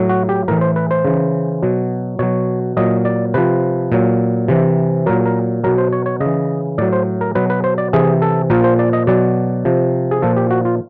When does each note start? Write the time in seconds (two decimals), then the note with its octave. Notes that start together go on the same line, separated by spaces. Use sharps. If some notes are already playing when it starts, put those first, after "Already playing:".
Already playing: A2 F#3
0.09 F#4
0.29 G4
0.48 A2 E3 A#4
0.61 C5
0.76 B4
0.91 C5
1.05 C#3 E3
1.63 B2 F#3
2.19 B2 F#3 C#5
2.77 A#2 F#3 D#5
3.05 D5
3.34 C3 F3 B4
3.92 A#2 F#3
4.48 C3 E3
5.06 A#2 F#3 A#4
5.26 A#4
5.64 B2 F#3 A#4
5.78 C5
5.93 C#5
6.06 C#5
6.20 C#3 D#5
6.26 E3
6.78 A2 F#3 D5
6.93 C5
7.21 A#4
7.35 B2 F#3 B4
7.50 B4
7.64 C5
7.78 D5
7.93 C3 E3 G#4
8.22 A4
8.50 A#2 F3 A#4
8.64 C5
8.79 D5
8.93 D#5
9.07 B2 F#3 D5
9.65 C3 F3
10.11 G#4
10.22 A#2 F3 A4
10.36 G4
10.50 F#4
10.65 F4